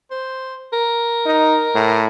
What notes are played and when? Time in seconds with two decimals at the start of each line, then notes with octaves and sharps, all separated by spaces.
0.11 C5
0.73 A#4
1.26 D#4
1.75 A2